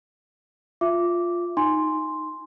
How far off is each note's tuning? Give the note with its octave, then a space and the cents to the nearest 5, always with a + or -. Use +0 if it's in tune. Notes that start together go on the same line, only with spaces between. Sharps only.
F4 +0 E5 +25 D6 -10
D#4 +0 G#5 +0 C6 +0